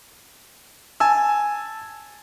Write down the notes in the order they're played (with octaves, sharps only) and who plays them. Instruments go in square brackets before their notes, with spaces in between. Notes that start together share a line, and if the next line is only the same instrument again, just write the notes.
[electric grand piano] G#5 A5 E6